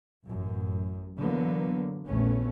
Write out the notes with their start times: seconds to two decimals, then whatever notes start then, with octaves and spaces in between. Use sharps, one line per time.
0.25 A1 F#2
1.18 D3 E3 F#3 A#3 B3
2.06 A#1 E2 A3 B3 C#4